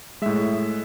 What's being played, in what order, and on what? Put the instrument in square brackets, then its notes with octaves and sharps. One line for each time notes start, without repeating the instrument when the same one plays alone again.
[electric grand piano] A2 G#3 E5